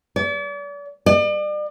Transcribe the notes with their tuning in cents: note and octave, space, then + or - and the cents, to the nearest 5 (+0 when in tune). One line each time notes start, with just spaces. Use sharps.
D5 -40
D5 +40